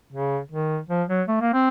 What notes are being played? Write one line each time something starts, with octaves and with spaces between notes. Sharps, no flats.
C#3
D#3
F3
F#3
A3
A#3
C4